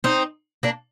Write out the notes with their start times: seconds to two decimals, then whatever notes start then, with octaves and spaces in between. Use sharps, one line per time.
0.04 C4 D#4
0.63 A#3 D4